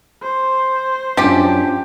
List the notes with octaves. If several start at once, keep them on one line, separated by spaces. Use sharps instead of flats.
C5
F#2 F3 C#4 D4 G4